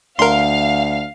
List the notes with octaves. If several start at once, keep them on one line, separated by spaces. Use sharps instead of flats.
D2 A#4 F5 C6